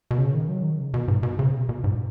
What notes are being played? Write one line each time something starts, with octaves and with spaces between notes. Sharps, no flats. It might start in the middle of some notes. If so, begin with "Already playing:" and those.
B2
C#3
D#3
F#3
D#3
C#3
B2
G#2
B2
C#3
B2
B2
G#2